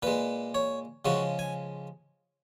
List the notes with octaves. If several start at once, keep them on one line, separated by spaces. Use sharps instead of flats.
A#2 G#3 B4
C#5
C#3 F3 G#3 F#4
G#5